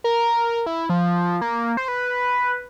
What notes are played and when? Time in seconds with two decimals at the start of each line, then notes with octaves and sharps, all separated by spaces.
0.04 A#4
0.66 E4
0.90 F3
1.41 A#3
1.77 C5
1.88 B4